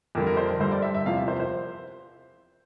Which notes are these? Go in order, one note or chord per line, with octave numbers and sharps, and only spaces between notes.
F2 D3 G3 A#4
A#4
C5
A#4
G2 D3 G3 C5
D5
E5
E5
E2 C3 F3 F5
E5
C5
C5